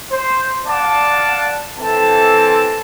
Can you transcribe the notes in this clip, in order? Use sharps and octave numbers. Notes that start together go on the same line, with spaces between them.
C5
D5 F5 F#5 A5
E3 C4 A4 A5